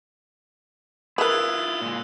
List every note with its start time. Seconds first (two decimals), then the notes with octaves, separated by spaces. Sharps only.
1.18 E4 F4 A#4 B4 D#6 E6 F#6
1.81 A#2 G#3